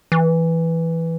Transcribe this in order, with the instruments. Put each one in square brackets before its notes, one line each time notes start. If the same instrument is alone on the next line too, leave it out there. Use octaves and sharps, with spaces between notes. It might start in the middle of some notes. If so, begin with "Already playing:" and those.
[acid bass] E3